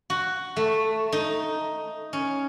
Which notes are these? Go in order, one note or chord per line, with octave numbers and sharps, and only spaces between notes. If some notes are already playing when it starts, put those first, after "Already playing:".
F#4
A3
D#4
C#4